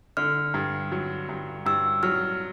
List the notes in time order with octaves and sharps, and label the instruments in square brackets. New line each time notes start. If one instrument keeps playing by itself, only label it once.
[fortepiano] D3 [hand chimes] F6
[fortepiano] G2
F#3
G2
[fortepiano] G2 [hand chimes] E6
[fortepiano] F#3 [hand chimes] F6